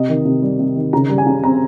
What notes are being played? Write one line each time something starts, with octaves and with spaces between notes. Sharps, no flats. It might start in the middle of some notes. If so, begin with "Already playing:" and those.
Already playing: C3 D#5
D#3
C3
G3
C3
D#3
C#3 A#5
G3
G#5
C#3
C4 A#5